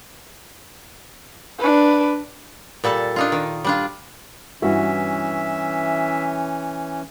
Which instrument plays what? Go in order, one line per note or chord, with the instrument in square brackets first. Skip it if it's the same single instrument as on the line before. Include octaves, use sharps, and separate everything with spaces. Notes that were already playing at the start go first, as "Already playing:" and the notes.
[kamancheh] D4 B4
[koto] A#2 G3 A4 A5
D4 D#4 F4
D#3
G3 D4 F4
[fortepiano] G2 E4 F#4 [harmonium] E3 C#4 [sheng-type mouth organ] E5